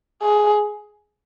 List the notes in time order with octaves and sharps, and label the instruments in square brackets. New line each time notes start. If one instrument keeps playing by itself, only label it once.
[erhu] G#4